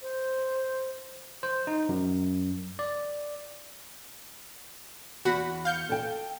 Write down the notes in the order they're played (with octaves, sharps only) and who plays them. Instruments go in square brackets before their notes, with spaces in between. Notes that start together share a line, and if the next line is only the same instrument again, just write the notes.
[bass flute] C5
[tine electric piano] C5
D#4
F#2
D5
[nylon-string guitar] E2 [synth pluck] F#4 F#5 B5
[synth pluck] F5 G6 C#7
[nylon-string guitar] A4 G5